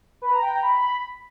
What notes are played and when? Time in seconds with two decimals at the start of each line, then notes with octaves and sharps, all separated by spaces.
0.22 B4
0.32 A#5
0.42 G5
0.52 A#5
0.62 B5